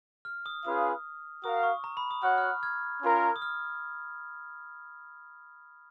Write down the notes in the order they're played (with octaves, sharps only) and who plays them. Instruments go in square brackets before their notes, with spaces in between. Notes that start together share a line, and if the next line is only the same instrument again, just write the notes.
[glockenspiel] F6
D#6
[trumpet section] C#4 F4 G#4 B4 F5 [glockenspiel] D#6
[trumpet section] F#4 A#4 F5 [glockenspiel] D#6
[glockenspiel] C#6
A#5
B5
D#6
[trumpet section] F#4 C#5 F#5 [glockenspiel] F6
[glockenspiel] F6
F#6
F6 G#6
[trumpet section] C#4 F4 A#4
[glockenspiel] D#6
F6